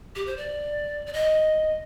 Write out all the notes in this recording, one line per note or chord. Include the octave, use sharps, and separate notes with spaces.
G4
C5
D5
D5
D#5